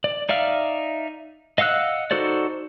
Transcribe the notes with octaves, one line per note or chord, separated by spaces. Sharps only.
D5
D#4 D5 E5 F5 F6
D#5 F5 F#5 E6 F#6
D#4 F#4 A4 C5 D5